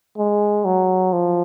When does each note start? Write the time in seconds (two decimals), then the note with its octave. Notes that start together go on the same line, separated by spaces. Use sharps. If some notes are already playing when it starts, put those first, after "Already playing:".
0.18 G#3
0.65 F#3
1.13 F3